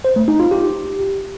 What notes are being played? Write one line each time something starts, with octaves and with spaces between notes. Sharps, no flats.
C5
A3
D#4
F4
G4